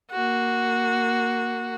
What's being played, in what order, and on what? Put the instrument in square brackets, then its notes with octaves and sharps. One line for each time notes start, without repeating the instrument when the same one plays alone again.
[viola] A#3 F#4